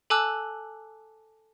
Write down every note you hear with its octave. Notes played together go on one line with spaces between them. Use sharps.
A4 G#5 A5 D6 E6 F#6